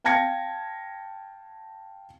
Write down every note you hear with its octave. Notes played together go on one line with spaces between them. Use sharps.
F5 G5 A5 G#6 A#6 C#7